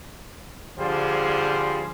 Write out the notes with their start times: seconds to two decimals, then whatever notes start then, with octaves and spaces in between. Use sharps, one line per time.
0.79 D3 F3 G3 G#4 C5